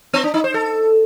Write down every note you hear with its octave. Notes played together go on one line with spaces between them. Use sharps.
B3
D4
D#4
C5
A4